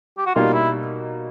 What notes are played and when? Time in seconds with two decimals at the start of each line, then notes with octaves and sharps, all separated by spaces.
0.18 G4
0.26 F#4
0.35 B2 G3 A#3 D#4 F4
0.54 E4